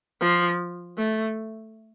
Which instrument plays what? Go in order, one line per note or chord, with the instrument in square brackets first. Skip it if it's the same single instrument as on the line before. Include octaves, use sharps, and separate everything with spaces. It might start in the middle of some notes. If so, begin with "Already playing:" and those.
[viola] F3
A3